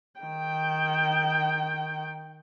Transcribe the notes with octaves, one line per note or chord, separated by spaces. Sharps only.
D#3 G5